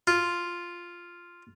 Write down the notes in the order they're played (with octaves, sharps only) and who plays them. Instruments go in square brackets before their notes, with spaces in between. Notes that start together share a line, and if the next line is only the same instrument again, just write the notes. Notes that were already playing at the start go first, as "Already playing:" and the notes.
[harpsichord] F4